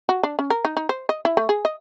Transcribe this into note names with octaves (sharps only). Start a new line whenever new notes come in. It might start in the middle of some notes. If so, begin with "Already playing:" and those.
F#4
D4
C#4
A#4
D#4
D#4
C5
D#5
E4
A3
G#4
D#5